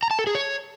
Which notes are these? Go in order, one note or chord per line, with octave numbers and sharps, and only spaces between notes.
A#5
A5
A4
G#4
C#5